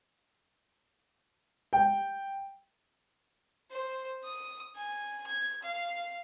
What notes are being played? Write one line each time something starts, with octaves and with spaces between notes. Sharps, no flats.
G5
C5
D#6
G#5
G#6
F5